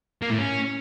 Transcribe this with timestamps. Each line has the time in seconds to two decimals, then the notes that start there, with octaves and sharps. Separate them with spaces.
0.22 A#3
0.30 A2
0.38 C#4